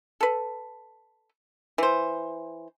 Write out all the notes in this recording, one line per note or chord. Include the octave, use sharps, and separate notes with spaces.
A4 B4
E3 C5